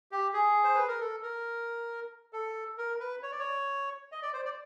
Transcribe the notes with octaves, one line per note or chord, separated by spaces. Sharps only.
G4
G#4
C5
B4
A#4
A4
A#4
A4
A#4
B4
C#5
D5
C#5
D#5
D5
C5
D5